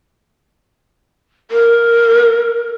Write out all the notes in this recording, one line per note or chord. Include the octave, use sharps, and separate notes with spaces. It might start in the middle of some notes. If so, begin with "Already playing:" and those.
A#4